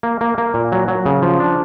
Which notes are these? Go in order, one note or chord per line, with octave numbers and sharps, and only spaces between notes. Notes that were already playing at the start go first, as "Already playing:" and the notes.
A#3
A#3
A#3
A#2
F#3
F#3
C#3
F3
D4